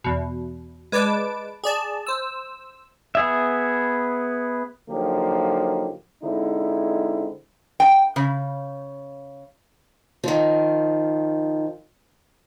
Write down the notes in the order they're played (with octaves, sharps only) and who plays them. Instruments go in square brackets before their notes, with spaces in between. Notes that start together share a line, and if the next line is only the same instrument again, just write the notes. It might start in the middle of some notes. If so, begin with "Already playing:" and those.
[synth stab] E2 B2
G#3 B4 D5 A5 D6 D7
G#4 D5 A5
C5 E6
[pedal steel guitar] B3 G#4 E5
[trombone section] D3 F3 F#3 A#3 D#4 G4
D3 G#3 C4 D#4 E4
[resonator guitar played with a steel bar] G5
C#3
[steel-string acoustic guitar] D#3 F3